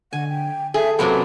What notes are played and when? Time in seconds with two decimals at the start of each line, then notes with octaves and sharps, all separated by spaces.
0.13 D3 F#5 G#5
0.29 G5
0.74 G#4 A4 E5
0.99 F#2 C3 F#3 A#3 B3 B4